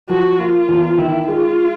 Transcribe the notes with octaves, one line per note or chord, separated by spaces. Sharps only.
F3 F#4
A#3 F4
E2
D#3 E4
G#3 F4